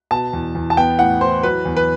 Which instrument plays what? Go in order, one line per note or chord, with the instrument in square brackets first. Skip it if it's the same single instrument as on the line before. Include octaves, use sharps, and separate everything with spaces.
[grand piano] B2 A5
E2
E2
A5
B3 G5
A2 F#5
E3 C5
F#3 B4
E2
B4